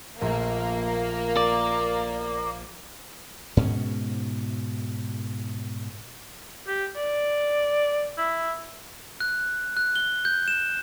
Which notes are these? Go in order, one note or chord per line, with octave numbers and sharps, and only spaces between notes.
A#1 A#2 A3 A#3
D5
G#2 B2 C#4
G4
D5
E4
F#6
F#6
G7
G6
E7